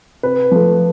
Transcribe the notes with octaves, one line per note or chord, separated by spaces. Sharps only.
C3 B4
F3 A3